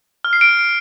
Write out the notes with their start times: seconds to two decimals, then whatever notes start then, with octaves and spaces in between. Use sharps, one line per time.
0.24 F6
0.33 C7
0.41 D7